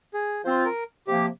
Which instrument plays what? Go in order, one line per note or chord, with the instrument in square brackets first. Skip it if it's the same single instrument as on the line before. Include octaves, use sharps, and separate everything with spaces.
[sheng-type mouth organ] G#4
[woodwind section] F3 C4 F4 [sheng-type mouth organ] C5
[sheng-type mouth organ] A#4
[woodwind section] C3 F3 A#3 [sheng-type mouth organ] G4